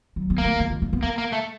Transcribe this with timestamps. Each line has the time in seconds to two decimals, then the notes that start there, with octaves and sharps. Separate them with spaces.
0.16 F#3
0.30 B3
0.38 A#3
0.45 A3
0.60 G#3
0.70 G#3
0.82 A#3
0.93 B3
1.03 A#3
1.18 A#3
1.32 A3